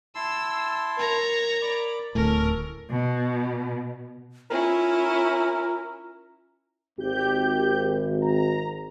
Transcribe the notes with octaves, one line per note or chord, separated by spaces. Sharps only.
E4 A5 C6 E6
A#4 C#5 A#5
D5 B5 D6
D1 A2 C#4 A4 A#4
B2
C#4 E4 F4 A#4
G#1 G4 G6
A#5